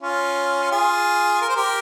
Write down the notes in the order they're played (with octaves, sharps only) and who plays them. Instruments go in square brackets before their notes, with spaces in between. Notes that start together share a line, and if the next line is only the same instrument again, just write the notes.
[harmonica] C#4 F4
F4 G#4
A#4
C5
G4 A#4